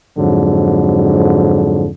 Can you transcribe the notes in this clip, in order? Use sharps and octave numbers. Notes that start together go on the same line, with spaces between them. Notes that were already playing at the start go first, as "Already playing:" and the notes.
F2 G#2 D3 F#3